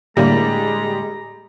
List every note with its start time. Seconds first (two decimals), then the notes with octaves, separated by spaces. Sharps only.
0.17 A2 D3 G3 G#3 A#3 A#5